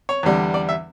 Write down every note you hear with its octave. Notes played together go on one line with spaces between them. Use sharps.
C#5
E2 D3 G3 D4
D5
E5